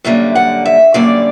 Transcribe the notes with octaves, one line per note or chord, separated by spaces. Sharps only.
F#2 D3 G3 A#3 E5
F#5
E5
F#2 D3 G3 A#3 D5